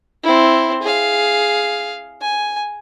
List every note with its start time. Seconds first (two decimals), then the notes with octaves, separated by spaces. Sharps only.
0.24 C4 E4
0.83 G#4 F5
2.21 G#5